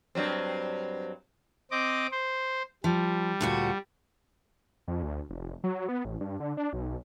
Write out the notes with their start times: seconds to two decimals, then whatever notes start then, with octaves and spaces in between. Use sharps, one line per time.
0.15 G2 F#3 C4
1.71 C4 D#5 D6
2.12 C5
2.84 F3 G3
3.41 D2 A#2 F#4
4.88 F2
5.03 D2
5.30 F1
5.64 F#3
5.89 B3
6.05 A1
6.21 G2
6.40 D3
6.57 D4
6.73 B1